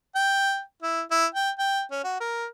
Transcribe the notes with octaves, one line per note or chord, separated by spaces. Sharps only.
G5
E4
E4
G5
G5
C#4
F#4
A#4